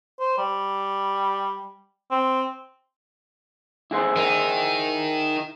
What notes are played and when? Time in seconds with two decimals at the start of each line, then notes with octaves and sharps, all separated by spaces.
0.20 C5
0.38 G3
2.11 C4
3.91 E4 G#4 C5
4.16 D#3 D#4